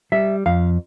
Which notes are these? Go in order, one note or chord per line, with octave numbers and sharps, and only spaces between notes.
G3 E5
F2 F5